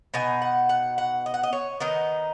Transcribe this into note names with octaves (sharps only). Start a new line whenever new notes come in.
B2 B3 D#4 G#5
F#5
F#5
F#5
D#5
F#5
D#5
C#5
D#3 B3 D#4 D#5